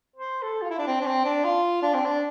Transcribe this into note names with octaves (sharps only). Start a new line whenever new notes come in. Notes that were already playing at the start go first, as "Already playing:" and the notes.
C5
A4
F4
E4
D4
C4
D4
C4
D4
F4
D4
C4
D4